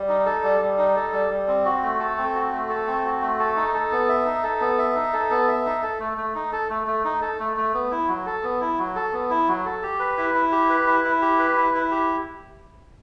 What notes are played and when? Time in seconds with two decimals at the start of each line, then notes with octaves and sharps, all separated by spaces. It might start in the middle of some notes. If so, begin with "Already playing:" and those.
Already playing: G3
0.09 D#4
0.26 A4
0.44 G3
0.61 G3
0.78 D#4
0.96 A4
1.13 G3
1.30 G3
1.48 C4
1.65 F#4
1.83 A3
2.00 A4
2.18 C4
2.35 F#4
2.53 A3
2.69 A4
2.87 C4
3.04 F#4
3.22 A3
3.39 A4
3.56 D#4
3.74 A4
3.92 B3
4.09 E5
4.26 D#4
4.43 A4
4.60 B3
4.78 E5
4.96 D#4
5.13 A4
5.31 B3
5.48 E5
5.66 D#4
5.83 A4
6.00 A3
6.18 A3
6.35 D#4
6.52 A4
6.70 A3
6.87 A3
7.05 D#4
7.22 A4
7.40 A3
7.57 A3
7.74 B3
7.91 E4
8.08 F#3
8.26 A4
8.43 B3
8.61 E4
8.78 F#3
8.96 A4
9.13 B3
9.30 E4
9.48 F#3
9.65 A4
9.83 G4
9.99 B4
10.17 E4
10.34 E4
10.52 G4
10.70 B4
10.87 E4
11.04 E4
11.22 G4
11.39 B4
11.57 E4
11.74 E4
11.91 G4